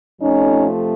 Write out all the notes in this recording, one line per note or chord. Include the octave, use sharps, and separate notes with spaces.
F2 C3 F3 A3 C#4 D#4